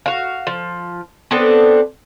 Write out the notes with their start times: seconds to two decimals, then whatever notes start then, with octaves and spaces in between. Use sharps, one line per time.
0.06 F#4 F5
0.47 F3
1.31 B3 C4 D4 A4